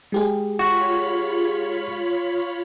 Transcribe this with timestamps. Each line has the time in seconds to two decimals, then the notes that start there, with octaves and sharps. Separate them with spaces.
0.12 G#3 G4 G#4
0.59 F4 F#4 C#5 B5